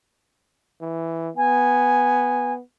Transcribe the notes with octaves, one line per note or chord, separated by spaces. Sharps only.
E3
B3 G#5